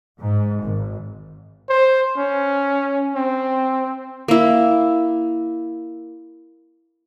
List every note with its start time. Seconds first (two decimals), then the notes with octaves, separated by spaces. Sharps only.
0.21 G#2
0.63 G#1
1.70 C5
2.17 C#4
3.16 C4
4.28 A#3 E4